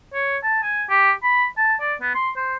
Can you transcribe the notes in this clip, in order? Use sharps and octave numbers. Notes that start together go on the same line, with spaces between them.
C#5
A5
G#5
G4
B5
A5
D5
B3
C6
C5